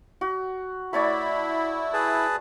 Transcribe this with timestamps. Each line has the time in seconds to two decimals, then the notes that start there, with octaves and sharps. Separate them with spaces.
0.21 F#4
0.93 A3 E4 C#5 D5 B5
1.93 G#4 B4 A5